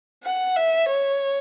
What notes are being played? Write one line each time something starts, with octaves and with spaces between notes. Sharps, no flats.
F#5
E5
C#5